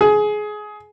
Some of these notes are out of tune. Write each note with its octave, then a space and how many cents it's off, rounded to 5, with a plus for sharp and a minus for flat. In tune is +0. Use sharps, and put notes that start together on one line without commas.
G#4 +20